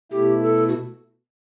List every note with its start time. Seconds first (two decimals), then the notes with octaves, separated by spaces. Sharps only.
0.11 B2 A3 E4 G4
0.43 A4
0.68 F#4